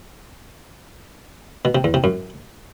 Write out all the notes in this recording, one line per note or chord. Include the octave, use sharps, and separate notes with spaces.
B2
C3
E2
C3
F#2